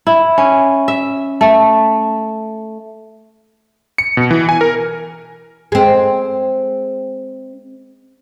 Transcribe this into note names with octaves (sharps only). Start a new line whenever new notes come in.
E4
C#4
E5
A3
C#7
B2
E3
G#5
A#4
G#3 C4